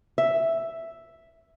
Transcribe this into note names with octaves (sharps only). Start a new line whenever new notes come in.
E5